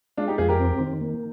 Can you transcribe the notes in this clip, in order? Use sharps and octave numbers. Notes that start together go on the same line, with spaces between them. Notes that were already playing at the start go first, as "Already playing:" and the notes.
G#3 D4 F4
D#4 G4
F2 F4 G#4
G4 A#4
C4
D#3
A#3